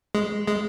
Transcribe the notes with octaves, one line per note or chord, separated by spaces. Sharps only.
G#3
G#3